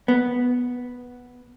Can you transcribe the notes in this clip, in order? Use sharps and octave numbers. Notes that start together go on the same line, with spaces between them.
B3